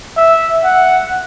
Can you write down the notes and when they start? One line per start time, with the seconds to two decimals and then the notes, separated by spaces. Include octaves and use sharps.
0.17 E5
0.64 F#5